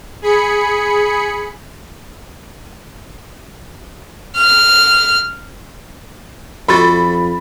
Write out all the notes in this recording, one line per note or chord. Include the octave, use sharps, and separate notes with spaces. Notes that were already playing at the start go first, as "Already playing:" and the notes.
G#4 B5 C#7
F6
F2 F4 F#4 A4 B5 A6